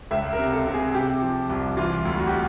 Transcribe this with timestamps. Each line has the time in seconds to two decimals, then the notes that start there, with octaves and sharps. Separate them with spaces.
0.11 C#2 E5
0.33 A#4
0.39 C3
0.53 A4
0.67 C3
0.74 G#4
0.95 C3 G4
1.22 F3
1.49 C2
1.77 E3 F4
2.05 D2
2.19 F#4
2.27 G4